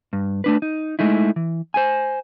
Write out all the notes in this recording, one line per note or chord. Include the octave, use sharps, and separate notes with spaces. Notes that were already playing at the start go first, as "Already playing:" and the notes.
G2
A3 D4 B4
D#4
G#3 A3 D#4 E4
E3
C5 G#5